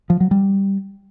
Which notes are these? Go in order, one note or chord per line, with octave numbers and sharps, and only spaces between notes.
F3
F#3
G3